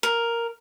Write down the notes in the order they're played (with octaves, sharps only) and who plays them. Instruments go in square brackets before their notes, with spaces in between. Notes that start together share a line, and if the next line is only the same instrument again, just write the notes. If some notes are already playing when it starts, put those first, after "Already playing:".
[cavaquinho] A#4